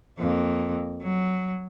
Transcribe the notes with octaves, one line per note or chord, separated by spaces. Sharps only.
F2 A#3
F#3